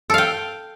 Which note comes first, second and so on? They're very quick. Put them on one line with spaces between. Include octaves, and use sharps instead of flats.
A4 F5 G5